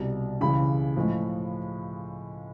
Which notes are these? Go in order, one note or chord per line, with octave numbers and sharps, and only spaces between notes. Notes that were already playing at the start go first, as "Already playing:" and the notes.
Already playing: C2 B2 G3 A#5
C#2 C#3 E3 B5
A2 F3 G#3